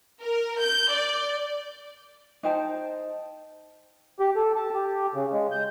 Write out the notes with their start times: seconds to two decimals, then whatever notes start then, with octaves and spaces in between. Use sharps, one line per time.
0.22 A#4
0.60 G6
0.92 D5
2.43 D#4 C5 G5 A5
4.20 G4
4.36 A4
4.56 A5
4.74 G4
5.14 C#3
5.33 G#3
5.51 G6